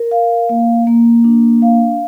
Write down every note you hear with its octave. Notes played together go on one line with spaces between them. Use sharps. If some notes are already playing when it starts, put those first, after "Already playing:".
Already playing: A#4
F5
A#3
A#3
D4
F5